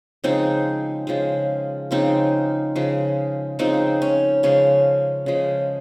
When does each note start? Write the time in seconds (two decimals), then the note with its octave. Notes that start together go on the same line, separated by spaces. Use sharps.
0.24 C#3 F3 G#3 C4 D#4
1.07 C#3 F3 G#3
1.91 C#3 F3 G#3 C4 D#4
2.76 C#3 F3 G#3
3.59 C#3 F3 G#3 C4 D#4
4.02 C#4
4.43 C#3 F3 G#3 C#4
5.26 C#3 F3 G#3